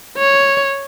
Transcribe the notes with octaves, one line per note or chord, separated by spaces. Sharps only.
C#5